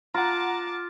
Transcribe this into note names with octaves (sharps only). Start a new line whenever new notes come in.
F4 F#5 A5 A#5 D6